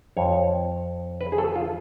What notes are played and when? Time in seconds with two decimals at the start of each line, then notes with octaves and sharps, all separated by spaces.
0.17 F2 F3 C#5
1.21 B4
1.32 G#4
1.38 A4
1.56 F4